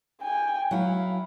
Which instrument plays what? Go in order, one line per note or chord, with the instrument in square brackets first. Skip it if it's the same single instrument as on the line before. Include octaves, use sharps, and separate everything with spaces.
[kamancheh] G5 G#5
[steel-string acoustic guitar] F#3 E4 [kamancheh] F5